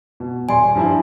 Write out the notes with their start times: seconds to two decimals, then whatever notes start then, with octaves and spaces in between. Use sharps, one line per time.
0.20 B2
0.49 D#1 D5 G#5 C6
0.75 G2 F3 E4